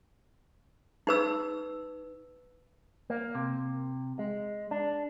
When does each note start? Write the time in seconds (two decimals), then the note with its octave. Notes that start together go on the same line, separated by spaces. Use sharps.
1.07 D#4 B4 E6
3.10 A#3
3.35 C3
4.19 G#3
4.71 D4